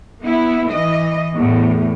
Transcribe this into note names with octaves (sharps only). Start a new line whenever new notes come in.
B3 E4
E3 D#5
E2 A2